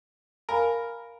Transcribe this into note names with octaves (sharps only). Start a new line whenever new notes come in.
A#4 F5 G#5 B5